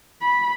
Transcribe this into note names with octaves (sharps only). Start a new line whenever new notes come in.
B5